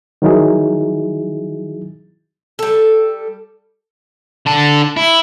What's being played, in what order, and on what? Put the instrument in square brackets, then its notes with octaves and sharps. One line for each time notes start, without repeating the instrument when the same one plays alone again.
[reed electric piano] D#3 F#3 D#4 E4 G#4
[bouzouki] G3 A4
[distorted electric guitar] D3 A5
E4